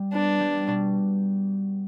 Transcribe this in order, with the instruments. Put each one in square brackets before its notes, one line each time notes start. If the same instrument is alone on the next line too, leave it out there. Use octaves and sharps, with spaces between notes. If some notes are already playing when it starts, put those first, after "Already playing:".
Already playing: [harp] G3
[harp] B3 [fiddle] D4
[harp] G3
B2